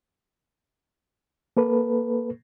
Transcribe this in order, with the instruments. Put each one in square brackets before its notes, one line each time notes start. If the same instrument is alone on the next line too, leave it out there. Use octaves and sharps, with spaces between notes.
[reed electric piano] A#3 A4 B4